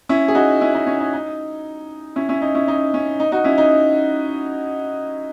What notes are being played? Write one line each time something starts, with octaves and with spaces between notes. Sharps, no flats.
C#4 E4
G#4
D#4 F#4
C#4 E4
D#4
C#4
D#4
D#4
C#4 E4
C#4 E4
D#4
C#4 E4
D#4
C#4
D#4
D#4 F#4
C#4 E4
D#4